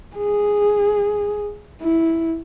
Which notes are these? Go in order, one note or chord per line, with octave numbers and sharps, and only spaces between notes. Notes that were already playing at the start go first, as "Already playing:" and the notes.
G#4
E4